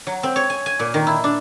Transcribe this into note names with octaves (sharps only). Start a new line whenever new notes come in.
F#3
C4
C#5
G#5
G#5
A#2
D#3
E4
D4